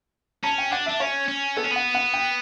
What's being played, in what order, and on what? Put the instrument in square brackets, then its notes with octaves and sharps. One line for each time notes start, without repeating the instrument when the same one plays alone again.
[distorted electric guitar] C#4 [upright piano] A5
[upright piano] G5
[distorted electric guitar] D4 [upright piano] F#5
[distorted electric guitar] D4 [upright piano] E5
[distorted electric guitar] C#4 [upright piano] C#5
[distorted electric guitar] C#4
[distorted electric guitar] B3 [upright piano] A4
[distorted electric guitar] C#4
[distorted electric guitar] B3 [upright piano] F#5
[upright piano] F#5
G5